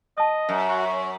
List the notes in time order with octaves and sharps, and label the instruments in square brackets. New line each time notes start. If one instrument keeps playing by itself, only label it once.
[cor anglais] D#5 [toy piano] A5 D#6
[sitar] F#2
[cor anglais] F#4
C#5